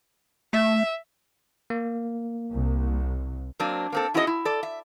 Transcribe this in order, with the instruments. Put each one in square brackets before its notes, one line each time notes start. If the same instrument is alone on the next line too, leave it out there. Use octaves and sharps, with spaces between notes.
[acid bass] A3 [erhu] E5
[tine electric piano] A#3
[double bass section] C2
[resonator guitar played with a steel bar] F#3 A#3 C4 D4
A#3 C4 A4
C#4 E4 F#4 G#4 C#5 D#5
E4
A4 D5
E5